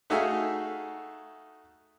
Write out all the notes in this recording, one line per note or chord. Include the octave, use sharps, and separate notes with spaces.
A3 D#4 F#4 G#4 E5 F5